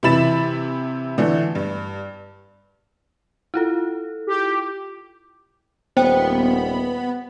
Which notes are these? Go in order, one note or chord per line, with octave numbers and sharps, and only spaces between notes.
C3 E3 E4 B5 A6 E7
D3 E3 A3
G2
E4 F4 A4
G4
D#1 B3 C5 G5